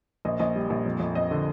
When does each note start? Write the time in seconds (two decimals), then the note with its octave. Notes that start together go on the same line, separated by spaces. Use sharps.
0.25 A#1 D#5
0.39 A#1 D#5
0.56 G3
0.70 A#1
0.86 F2
1.00 F2
1.15 F2 D#5
1.31 D3